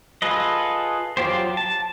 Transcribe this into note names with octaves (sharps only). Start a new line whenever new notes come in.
F4 G#4 A4 B4 D#5
F#3 F4 G4 C5
A5